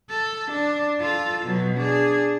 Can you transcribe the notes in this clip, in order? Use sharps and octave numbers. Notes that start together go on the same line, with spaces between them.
A4
D4
F4 A4
B2 F#3
D4 G#4